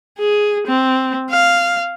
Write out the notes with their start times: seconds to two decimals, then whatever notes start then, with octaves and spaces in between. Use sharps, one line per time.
0.18 G#4
0.67 C4
1.31 F5